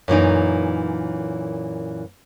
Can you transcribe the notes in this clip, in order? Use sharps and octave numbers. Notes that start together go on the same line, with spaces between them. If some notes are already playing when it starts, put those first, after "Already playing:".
F#2 A#2 E3 D#4